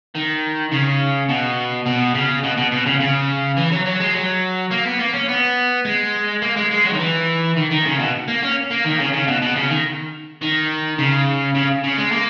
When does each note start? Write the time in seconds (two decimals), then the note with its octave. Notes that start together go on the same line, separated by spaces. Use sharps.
0.15 D#3
0.72 C#3
1.29 B2
1.86 B2
2.14 C#3
2.43 B2
2.57 B2
2.71 B2
2.86 C#3
3.00 C#3
3.57 E3
3.71 F#3
3.85 F#3
4.00 G#3
4.14 F#3
4.71 A#3
4.85 B3
4.99 A#3
5.13 C#4
5.28 B3
5.85 G#3
6.42 A#3
6.56 G#3
6.71 G#3
6.85 F#3
6.93 D#3
6.99 E3
7.56 D#3
7.70 D#3
7.85 C#3
7.99 B2
8.28 A#3
8.42 C#4
8.70 A#3
8.85 D#3
8.99 C#3
9.13 C#3
9.27 B2
9.41 B2
9.55 C#3
9.70 D#3
10.41 D#3
10.98 C#3
11.55 C#3
11.84 C#3
11.98 G#3
12.12 A#3